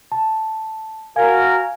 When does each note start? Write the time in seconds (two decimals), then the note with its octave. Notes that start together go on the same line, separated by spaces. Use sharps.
0.12 A5
1.16 F#4 A#4 F5 G#5 G#6